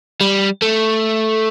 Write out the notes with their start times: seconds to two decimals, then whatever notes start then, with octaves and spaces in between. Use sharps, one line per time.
0.21 G3
0.62 A3